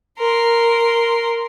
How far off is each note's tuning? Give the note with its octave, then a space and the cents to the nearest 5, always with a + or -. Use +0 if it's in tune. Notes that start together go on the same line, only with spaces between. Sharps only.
A#4 +0 C6 -5